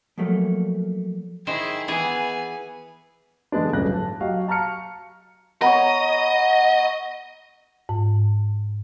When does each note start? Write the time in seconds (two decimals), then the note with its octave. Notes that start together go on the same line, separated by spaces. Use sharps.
0.18 F3 F#3 A3 A#3
1.47 D#3 E4 G#4 C5
1.88 E3 B3 G#4 G#5
3.52 E2 D3 G#3 B3 D4
3.73 D1 G1 C#3 A3 F#6 A#6
3.94 A5
4.20 F#3 G4 D#5 F5 C#6
4.48 F5 A5 A#5 C#6 F6 C#7
5.62 B3 C#5 D#5 A#5
7.89 G#2